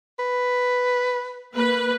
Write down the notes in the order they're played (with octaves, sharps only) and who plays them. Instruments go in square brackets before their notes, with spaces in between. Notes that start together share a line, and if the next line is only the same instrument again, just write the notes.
[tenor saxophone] B4
[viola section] A#3 B4